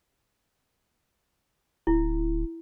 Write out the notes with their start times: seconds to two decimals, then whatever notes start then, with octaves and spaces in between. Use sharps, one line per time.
1.87 D1 E4